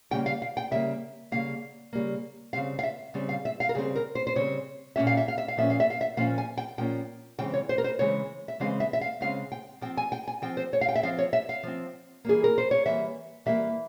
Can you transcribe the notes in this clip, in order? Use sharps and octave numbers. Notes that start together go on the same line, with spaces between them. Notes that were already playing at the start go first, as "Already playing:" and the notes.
C#3 G3 A#3 G5
F5
F5
G5
C#3 G3 A#3 E5
C#3 G3 A#3 F5
C#3 G3 A#3
C#3 G3 C4 F5
F5
E5
C#3 G3 C4
F5
E5
F5
A#4
C#3 G3 C4 G#4
A#4
C5
C5
C#3 G3 C4 C#5
A#2 F3 A#3 C#4 E5
F5
E5
F5
E5
F5
A#2 F3 A#3 C#4 E5
F5
E5
F5
E5
A#2 F3 A#3 C#4 F5
G#5
G5
A#2 F3 A#3 C#4 G5
C#3 E3 G#3 C4 G5
C#5
C5
A#4
C5
C#3 E3 G#3 C4 C#5
E5
C#3 E3 G#3 C4 F5
E5
E5
F5
C#3 E3 G#3 C4 F5
G5
F3 C4 G5
G#5
G5
G#5
F3 C4 G5
C5
C#5
F5
G5
E5
F3 C4 F5
C#5
E5
F5
F3 C4
E3 G3 A#3 G#4
A#4
C5
C#5
E3 G3 A#3 E5
E3 G3 A#3 E5